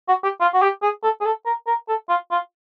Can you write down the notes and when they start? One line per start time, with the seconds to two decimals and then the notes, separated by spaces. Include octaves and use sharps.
0.08 F#4
0.24 G4
0.41 F4
0.54 F#4
0.62 G4
0.82 G#4
1.03 A4
1.21 G#4
1.25 A4
1.46 A#4
1.67 A#4
1.89 A4
2.09 F4
2.31 F4